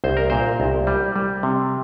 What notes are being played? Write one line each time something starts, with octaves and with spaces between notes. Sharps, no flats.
C2 C5
A#4
A#2 C5
C2
G3
G3
C3